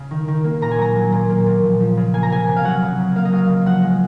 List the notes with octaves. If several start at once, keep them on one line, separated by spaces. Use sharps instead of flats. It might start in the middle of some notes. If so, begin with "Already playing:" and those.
Already playing: C#3
D#3
D#3
A#3
A#2 A#5
G#5
F#3 A#5
F#3
A#2
A#3
A#2
F3
F3
C#3
A#3 G#5
A#5
C3 G#5
C3
F5
F#3 F#5
C#3
C#3
A#3 F5
D#5
F#3 F5
C#3
F3 F#5
G#3